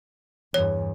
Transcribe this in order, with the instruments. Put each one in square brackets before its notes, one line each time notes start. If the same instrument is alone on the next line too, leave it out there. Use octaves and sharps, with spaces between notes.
[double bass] E2 G2 [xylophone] C#5